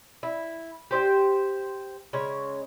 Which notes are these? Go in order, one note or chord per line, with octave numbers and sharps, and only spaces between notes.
E4
G4 C5 D5 G5
C#3 G#3 C#5